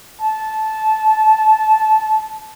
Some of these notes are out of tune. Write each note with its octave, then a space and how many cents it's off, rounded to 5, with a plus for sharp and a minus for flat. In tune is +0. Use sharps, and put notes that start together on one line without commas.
A5 -15